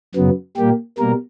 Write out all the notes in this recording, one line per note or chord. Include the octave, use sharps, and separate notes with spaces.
F#2 C#3 F#3 B3
A#2 G3 A#3 G4
B2 G3 A#3 A#4